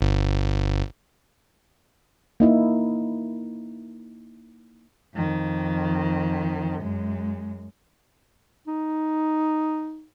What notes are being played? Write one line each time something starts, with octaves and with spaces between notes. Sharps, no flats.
G1
A#3 D#4 E4
F2 D#3
F#2 G#3
D#4